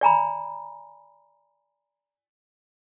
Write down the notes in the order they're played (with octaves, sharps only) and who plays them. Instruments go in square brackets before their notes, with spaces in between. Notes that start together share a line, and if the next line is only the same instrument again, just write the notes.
[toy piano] D5 G#5 A#5 B5